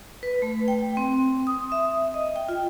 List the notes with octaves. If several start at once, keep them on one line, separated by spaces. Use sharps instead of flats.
B4
A3
G5
C4
D#6
E5
D#5
G5
F4